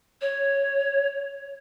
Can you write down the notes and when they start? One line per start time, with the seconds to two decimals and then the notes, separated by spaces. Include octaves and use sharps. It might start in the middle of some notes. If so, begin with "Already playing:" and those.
0.21 C#5